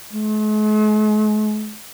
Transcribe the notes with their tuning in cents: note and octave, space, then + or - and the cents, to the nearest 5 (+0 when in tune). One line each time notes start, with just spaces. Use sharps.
G#3 +45